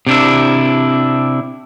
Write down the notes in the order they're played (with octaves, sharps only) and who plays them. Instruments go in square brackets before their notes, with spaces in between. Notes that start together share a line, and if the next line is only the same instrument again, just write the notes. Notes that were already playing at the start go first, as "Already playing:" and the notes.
[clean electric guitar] C3 D4 E4